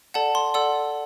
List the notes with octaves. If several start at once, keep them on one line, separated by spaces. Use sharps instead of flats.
A4 D5 F#5 A5
C6
A4 D5 F#5 E6